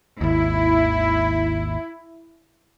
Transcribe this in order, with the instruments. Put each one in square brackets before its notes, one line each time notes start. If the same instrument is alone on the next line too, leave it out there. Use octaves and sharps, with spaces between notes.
[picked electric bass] G#1 D#2 [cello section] E4